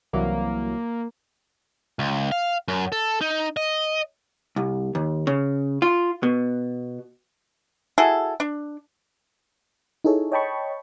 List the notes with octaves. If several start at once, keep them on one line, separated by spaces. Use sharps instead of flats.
C2 E3 F#3 A#3
C#2
F5
F#2
A4
D#4
D#5
C2
D#2
C#3
F4
B2
E4 F#4 G#4 A4
D4
D#4 E4 G#4 A4 C#5
C#5 D#5 G5 A5 B5 C#6